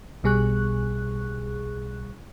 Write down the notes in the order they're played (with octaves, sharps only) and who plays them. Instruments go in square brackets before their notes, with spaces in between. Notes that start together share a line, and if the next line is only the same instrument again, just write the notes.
[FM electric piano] B1 B2 G3 G#4 C#6 F#6